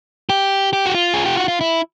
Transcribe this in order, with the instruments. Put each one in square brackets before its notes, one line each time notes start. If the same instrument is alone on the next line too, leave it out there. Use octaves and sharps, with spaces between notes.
[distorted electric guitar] G4
G4
F#4
F4
G#4
G4
F#4
F4
E4